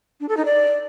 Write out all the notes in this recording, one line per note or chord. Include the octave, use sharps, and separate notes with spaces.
D4
A4
D#4
D5